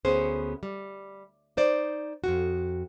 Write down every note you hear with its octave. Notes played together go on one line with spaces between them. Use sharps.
D2 B3 C#4 G#4 C5
G3
D#4 C5 D5
F2 A#2 F#4